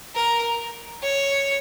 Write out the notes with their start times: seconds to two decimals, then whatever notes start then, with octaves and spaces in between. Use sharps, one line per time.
0.15 A#4
1.02 C#5